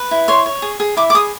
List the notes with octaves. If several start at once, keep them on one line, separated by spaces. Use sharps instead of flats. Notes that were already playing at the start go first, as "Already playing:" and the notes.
Already playing: B4
E4
C#5 C6
C#5
G#4
G#4
E4 D6
D6
G#4 D#6